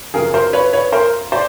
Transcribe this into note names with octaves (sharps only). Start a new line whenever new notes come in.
F#2 C#3 F3 G#4 A#4
A#4 C5
B4 C#5
B4 C#5
A#4 C5
C5 D5